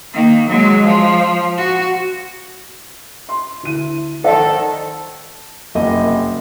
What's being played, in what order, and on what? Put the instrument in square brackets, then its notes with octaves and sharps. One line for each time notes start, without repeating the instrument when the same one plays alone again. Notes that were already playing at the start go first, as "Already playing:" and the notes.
[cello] D#3 A#3
F#3 G#3
F3
F#4
[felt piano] C6
D2 E4 D#7
[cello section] D#3 A4 [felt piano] C5 D5 F#5
[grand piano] F#1 C2 D#5